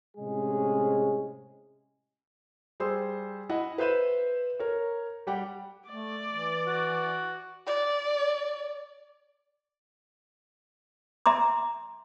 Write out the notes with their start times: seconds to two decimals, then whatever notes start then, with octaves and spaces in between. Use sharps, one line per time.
0.17 A2 C3 G#3 C#4 G#4
2.80 G3 G#4 C5 C6 E6
3.49 E4 D#5 F#5
3.78 B4 C5 E5 G6 D#7 E7
4.59 A#4 C#5
5.27 G3 G4 F#5 G5
5.89 A3 D5
6.31 E3
6.67 F#4
7.66 D5
11.26 E5 A#5 C6 D6